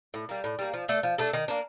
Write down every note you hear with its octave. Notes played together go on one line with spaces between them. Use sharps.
A2
G3 A#3
A2
G3 A#3
F3
A3 D4 A4
F3
A3 D4 A4
D#3
A#3 D4